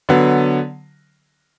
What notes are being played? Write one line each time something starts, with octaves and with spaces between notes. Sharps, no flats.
D3 F#3 B3